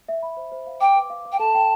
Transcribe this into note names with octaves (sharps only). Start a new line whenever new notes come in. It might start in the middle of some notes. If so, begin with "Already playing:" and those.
E5
B5
C5
C5
F5
G5 D6
B4
F5
F5
G5
A4 A5
G5